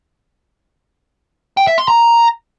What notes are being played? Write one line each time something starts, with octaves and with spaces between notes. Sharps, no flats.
G5
E5
C6
A#5